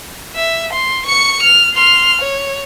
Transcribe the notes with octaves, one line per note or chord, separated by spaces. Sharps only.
E5
C6
C#6 C#7
F6
C6 F6
C#5